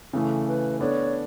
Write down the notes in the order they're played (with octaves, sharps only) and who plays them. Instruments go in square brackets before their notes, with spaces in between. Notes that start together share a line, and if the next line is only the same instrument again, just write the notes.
[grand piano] C#3 E3 A3 [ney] A4
[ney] B4
[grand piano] B3 D4 A4 [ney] C#5